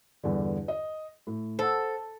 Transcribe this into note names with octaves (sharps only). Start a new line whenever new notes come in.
E2 G2 D3
D#5
A2
A4 C5 F#5